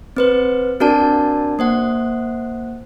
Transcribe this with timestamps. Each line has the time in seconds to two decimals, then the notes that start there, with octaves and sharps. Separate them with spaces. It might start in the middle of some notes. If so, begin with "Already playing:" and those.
0.17 C4 B4 C5
0.80 C4 D4 F#4 A#4 D5 A5
1.59 A#3 C5 F#5